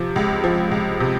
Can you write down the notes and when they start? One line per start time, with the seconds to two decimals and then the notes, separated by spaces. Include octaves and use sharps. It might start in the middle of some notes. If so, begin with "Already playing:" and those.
Already playing: C3 F3
0.16 C#2
0.44 F3
0.71 C#2
1.00 C3